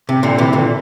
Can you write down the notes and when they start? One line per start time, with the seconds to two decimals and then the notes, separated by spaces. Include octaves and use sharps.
0.09 C3
0.23 A#2 D3
0.38 C3 E3
0.53 A#2 D3